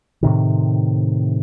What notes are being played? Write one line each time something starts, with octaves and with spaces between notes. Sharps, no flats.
A2 C3 D#3